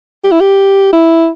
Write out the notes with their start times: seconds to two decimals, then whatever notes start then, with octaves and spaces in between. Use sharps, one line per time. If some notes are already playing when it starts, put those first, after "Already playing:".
0.24 G4
0.32 E4
0.41 G4
0.93 E4